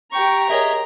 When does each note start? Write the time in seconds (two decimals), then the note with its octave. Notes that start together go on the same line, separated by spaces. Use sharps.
0.12 G4 G5 A#5 C#6
0.50 G#4 A#4 C#5 D#5 E5